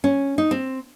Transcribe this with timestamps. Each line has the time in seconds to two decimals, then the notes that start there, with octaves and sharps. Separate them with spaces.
0.04 C#4
0.38 D#4
0.51 C4